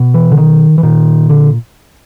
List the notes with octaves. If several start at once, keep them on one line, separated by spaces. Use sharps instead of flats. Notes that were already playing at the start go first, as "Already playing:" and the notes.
Already playing: B2
E3
D3
D#3
E3
A#2 D#3
D3